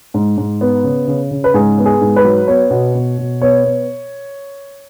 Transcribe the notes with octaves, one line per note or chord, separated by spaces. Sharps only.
G#2
G#2
B3
C#3
C#3
C#3
B4
G#2 G#4
B3
G#4
G#2
B4
F#3
B3 C#5
B2
B2
B2
B3 C#5
B3